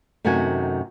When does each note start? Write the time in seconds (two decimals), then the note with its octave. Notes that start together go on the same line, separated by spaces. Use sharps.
0.25 F#2 C3 D#3 A3 F#4 G#5